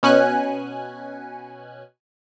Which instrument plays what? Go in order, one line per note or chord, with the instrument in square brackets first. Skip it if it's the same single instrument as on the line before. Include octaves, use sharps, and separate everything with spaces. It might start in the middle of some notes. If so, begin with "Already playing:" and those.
[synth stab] B2 C#4 G#5 F#6